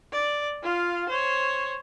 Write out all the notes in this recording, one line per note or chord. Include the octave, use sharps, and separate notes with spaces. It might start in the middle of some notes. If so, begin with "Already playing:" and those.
D5
F4 F5
C5 C#5